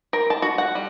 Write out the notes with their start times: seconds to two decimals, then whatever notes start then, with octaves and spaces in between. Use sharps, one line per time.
0.13 A#4
0.30 A5
0.42 F#4
0.58 F#5
0.75 G3